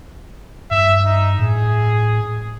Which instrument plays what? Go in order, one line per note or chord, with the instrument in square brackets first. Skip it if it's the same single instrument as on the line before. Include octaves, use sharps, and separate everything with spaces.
[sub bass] G2 [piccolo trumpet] E5
[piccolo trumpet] D#4
[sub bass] A2 [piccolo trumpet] G#4